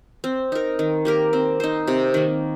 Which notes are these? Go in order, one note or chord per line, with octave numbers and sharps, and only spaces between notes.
C4
D#4 A#4
D#3
A#3 G4 A#4
C4
D#4 C5
C3
D#3 A#3